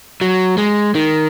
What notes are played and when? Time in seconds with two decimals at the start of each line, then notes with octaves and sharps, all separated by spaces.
0.21 F#3
0.58 G#3
0.95 D#3